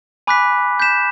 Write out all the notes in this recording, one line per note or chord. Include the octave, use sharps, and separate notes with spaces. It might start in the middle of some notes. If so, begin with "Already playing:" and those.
G#5 B5 D6 F#6 B6
G6 B6 E7